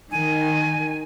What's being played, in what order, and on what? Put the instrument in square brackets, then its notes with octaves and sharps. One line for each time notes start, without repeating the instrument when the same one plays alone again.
[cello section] D#3 [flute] G#5